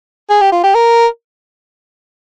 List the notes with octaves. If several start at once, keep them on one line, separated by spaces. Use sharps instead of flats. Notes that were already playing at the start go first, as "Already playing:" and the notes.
G#4
G4
F4
G4
A#4